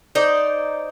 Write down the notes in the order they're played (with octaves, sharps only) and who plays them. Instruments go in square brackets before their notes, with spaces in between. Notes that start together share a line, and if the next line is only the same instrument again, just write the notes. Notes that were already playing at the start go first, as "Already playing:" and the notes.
[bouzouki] D#4 C5 D5